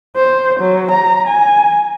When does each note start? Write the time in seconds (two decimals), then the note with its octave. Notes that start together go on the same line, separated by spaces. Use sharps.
0.16 C5
0.60 F#3
0.91 A#5
1.28 G#5